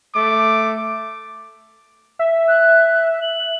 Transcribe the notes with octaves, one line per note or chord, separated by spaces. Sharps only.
A3 D6
E5
F#6
F#7